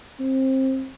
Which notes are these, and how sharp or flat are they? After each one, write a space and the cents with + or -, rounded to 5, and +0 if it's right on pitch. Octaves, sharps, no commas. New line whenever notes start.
C4 +20